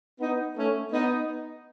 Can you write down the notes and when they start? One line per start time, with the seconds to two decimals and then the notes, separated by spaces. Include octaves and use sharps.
0.20 B3 D#4
0.57 A3 C#4
0.93 B3 D#4